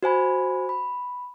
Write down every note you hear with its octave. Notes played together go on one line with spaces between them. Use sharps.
F#4 C5 G#5 B5
B5